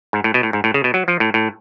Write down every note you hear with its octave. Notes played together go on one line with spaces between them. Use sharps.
G#2
A2
B2
A2
G#2
A2
C#3
B2
F#3
F3
A2
A2